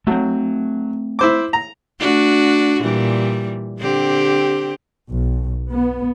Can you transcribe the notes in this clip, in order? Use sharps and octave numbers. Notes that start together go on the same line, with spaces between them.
F#3 A3 C4
E4 C5 D6
A#5
A3 D4 F#4
A#2 E3 G3
D3 C4 G4
B1
B3